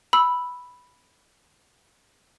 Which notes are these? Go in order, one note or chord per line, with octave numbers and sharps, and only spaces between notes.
B5 E6